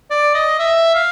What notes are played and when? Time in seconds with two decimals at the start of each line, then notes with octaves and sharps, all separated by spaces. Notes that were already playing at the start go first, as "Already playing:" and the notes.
0.10 D5
0.34 D#5
0.59 E5
0.95 F5